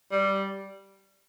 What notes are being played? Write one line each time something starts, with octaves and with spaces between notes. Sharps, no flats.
G3